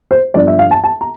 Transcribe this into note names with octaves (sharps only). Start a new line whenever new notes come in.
C5
G1 G2 F3 D5
E5
F5
A5
A5
A#5